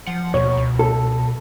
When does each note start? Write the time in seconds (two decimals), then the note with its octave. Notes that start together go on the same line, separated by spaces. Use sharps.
0.07 F3 F#5
0.34 D#2 B2 C#5
0.57 C#2
0.79 A4